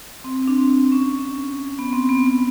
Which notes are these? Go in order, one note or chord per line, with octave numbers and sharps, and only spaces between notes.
C4
C4
D4
C4
C#4
B3
C4
B3
B3